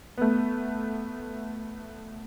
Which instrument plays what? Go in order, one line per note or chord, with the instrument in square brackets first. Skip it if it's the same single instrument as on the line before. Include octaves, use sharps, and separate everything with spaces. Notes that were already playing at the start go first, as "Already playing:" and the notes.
[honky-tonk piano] A3 B3